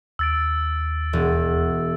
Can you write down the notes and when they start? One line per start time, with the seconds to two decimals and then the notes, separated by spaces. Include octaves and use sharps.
0.19 D#2 E6 A6 D7
1.13 E1